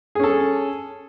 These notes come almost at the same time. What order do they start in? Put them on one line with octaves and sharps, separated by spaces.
G#4 C#4 A4